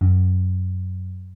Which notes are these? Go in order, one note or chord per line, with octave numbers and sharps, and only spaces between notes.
F#2